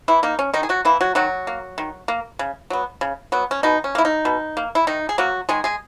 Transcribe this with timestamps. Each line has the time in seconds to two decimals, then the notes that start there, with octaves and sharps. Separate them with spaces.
0.08 E3 E4
0.23 A#3 D#4
0.39 C#4
0.54 D#3 D#4
0.63 G#4
0.69 F#3 F#4
0.85 E3 A#3 E4
1.01 F#3 F#4
1.15 D#3 F#3 F#4
1.47 A#3
1.78 D#3
2.08 A#3
2.39 C#3
2.70 F#3 B3
3.01 C#3
3.32 F#3 B3
3.51 C#4
3.63 B2 D#4
3.84 C#4
3.95 A#3 E4
4.05 D#4
4.25 B2
4.57 A#3
4.75 E4
4.87 D#3 D#4
5.09 G#4
5.18 F#3 A#3 F#4
5.49 D#3 G#3 G#4
5.64 G#3 G#4